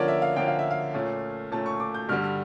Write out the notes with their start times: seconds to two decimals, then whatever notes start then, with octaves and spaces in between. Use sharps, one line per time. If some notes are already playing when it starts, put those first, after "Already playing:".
Already playing: D3 F3 A#3 C#4 C#5 D5
0.08 E5
0.22 F5
0.36 D3 F3 A#3 C#4 G5
0.48 F5
0.59 E5
0.71 F5
0.94 A#2 A3 C#4
1.52 A#2 A3 C#4 A5
1.66 C#6
1.80 D6
1.94 G6
2.09 G2 D3 G3 F6
2.24 F6